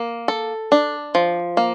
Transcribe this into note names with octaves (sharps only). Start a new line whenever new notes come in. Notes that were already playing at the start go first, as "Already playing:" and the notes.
Already playing: A#3
A4
D4
F3
A#3